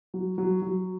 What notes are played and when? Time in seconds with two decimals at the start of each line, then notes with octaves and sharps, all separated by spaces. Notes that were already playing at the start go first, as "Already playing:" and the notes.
0.14 F#3
0.38 F#3
0.62 F#3